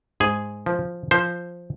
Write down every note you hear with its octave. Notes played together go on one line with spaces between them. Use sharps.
G#2 G#4
F3
F3 C5